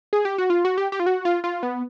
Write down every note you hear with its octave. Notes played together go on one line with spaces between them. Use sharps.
G#4
G4
F#4
F4
F#4
G4
G4
F4
F#4
F4
F4
B3